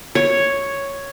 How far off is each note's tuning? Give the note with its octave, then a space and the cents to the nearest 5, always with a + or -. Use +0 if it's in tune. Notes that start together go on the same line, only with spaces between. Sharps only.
C#5 +0